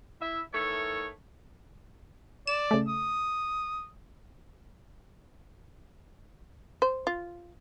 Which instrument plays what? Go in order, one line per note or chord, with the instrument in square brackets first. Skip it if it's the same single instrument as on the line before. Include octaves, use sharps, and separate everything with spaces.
[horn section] E4 E5
D#3 E3 A3 A4 C#5
[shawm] D5 [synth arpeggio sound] E7
[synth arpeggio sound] C#3 A3
[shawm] D#6
[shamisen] C5
F4